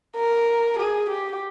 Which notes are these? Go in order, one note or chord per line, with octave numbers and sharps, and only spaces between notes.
A#4
G#4
G4